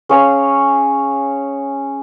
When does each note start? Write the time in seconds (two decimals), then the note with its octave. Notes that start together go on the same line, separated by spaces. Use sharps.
0.09 C#4 G#4 C#5 F5